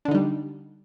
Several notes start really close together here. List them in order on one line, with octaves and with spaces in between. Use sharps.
D4 D3 D#4 G3